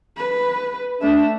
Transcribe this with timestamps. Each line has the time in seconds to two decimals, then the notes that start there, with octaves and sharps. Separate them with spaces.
0.17 B4
1.01 A3 D4 E5